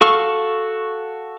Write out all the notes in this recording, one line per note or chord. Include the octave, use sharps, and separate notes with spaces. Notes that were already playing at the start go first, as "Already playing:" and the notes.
F#4 A4 F5 C#6 F6